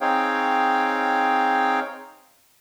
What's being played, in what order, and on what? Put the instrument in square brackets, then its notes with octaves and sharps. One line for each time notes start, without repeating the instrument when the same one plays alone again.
[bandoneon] C4 D#4 G#4 C#5 F5 G5